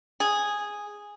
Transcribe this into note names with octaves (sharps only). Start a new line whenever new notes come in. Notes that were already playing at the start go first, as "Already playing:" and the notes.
G#4